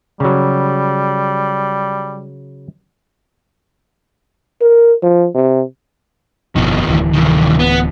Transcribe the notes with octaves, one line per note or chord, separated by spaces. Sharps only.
C#3 F#3 G3
A#4
F3
C3
G1 F2 B2 D#3 F3
D1 D2 E3
C2 D#3
B3